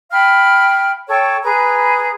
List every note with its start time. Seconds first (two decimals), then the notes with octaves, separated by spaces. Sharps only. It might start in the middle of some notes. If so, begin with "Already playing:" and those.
0.11 F5 G5 B5 F6
1.08 A4 C#5 G5 C#6
1.43 G#4 B4 A#5